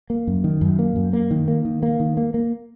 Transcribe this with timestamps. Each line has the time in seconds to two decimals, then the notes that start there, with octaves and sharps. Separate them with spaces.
0.10 A#3
0.27 F#2
0.44 D#3
0.61 F#2
0.79 A#3
0.96 F#2
1.13 A#3
1.31 D#3
1.48 A#3
1.65 D#3
1.83 A#3
2.00 D#3
2.17 A#3
2.34 A#3